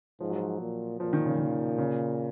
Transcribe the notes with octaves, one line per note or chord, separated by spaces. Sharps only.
G#2 F3
F#3
F3
A#2
A#2 F3
D#3
C#3
D#3
C#3